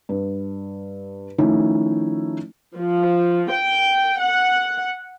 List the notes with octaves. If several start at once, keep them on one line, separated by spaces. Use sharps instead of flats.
G2
D#3 F3 A3 C#4 D#4 E4
F3
G5
F#5